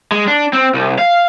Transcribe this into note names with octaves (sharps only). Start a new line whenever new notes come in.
G#3
D4
C4
C2
F5